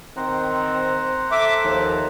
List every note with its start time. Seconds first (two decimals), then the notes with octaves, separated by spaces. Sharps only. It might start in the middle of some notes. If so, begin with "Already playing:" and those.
0.16 D#3 C4 C5 F#5 A#5
1.32 A4 E5 D6
1.64 D#2 F3